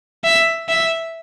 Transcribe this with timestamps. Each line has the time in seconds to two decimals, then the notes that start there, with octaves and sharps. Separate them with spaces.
0.24 E5
0.69 E5